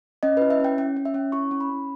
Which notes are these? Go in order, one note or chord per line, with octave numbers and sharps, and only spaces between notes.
C#4 D#5
E4 B4
E5
C#4 G5
C#4 G5
C#4
E5
C#4
E4 C#6
C#4
B5
C#4